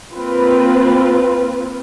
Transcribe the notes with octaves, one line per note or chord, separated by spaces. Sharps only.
A#3 C4 F4 B4